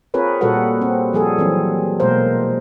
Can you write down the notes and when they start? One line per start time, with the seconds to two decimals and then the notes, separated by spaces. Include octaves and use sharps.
0.14 C4 F4 G#4 A#4 B4 C#5
0.41 A#2 G3 F#4 A4 B4 F#5
0.82 C4
1.13 F3 G3 G#4 A4
1.38 E3 F#3 C4
2.00 B2 G#3 A#3 A#4 C5